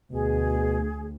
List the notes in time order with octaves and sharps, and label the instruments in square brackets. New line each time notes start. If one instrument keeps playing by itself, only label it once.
[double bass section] D2 [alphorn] B2 [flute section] G#4